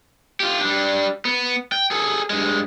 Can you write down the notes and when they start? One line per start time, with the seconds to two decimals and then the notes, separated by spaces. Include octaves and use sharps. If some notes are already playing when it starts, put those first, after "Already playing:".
0.40 F4 G4
0.61 G3 D4
1.25 B3
1.72 G5
1.91 G#4 A4
2.30 G2 G#3